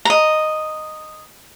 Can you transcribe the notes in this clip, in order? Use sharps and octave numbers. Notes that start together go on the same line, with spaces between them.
D#5 A#5